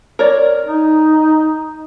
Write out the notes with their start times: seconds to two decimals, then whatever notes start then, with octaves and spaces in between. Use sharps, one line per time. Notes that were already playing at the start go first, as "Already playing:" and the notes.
0.19 A#4 C#5 D5
0.66 D#4